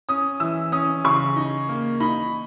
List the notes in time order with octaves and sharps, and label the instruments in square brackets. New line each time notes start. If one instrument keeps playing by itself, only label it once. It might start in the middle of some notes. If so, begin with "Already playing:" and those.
[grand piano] C#4 [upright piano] D#6
[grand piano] E3 [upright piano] E6
[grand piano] C#4 [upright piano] D#6
[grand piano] C#3 [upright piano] C#6
[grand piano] D#4
A#3
[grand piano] D#4 [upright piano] B5